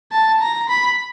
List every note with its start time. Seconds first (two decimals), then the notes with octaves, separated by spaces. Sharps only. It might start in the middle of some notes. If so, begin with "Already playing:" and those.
0.12 A5
0.41 A#5
0.69 B5